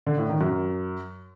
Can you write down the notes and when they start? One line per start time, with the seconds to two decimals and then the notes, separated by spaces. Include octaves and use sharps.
0.07 D3
0.18 A2
0.29 D#3
0.41 F#2